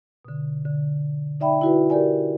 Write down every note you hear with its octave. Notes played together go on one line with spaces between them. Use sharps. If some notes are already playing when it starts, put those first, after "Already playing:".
B2 D3
D3
D#4 D5 E5 G5 B5
E4 F#4 B4
G4 A#4 D5 G#5